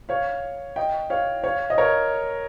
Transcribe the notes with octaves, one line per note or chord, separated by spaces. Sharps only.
C#5 F5
D#5 G5
C#5 F5
C#5 F5
D#5
A#4 C#5